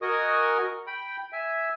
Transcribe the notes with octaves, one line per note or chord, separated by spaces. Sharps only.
F#4 A#4 D#5 G#5 C#6 D#6
G5 B5
E5 G#5